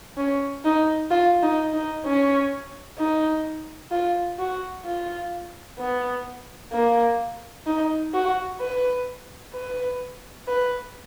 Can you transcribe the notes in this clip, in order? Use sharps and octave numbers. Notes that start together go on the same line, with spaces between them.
C#4
D#4
F4
D#4
D#4
C#4
D#4
F4
F#4
F4
B3
A#3
D#4
F#4
B4
B4
B4